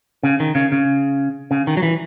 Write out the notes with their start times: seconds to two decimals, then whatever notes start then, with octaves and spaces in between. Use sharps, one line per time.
0.23 C#3
0.40 D#3
0.55 C#3
0.72 C#3
1.51 C#3
1.67 D#3
1.77 F#3
1.83 E3